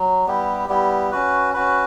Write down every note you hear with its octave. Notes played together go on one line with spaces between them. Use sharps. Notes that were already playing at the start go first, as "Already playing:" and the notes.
Already playing: F#3
G3 B3 E4 G4
G3 B3 E4 G4
C#4 F#4 B4
C#4 F#4 B4